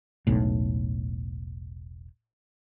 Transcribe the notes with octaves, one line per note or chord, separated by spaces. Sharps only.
E1 B1 A2